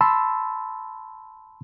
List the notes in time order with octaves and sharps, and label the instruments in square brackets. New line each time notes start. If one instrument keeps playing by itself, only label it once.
[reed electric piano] A5 B5 C6 E6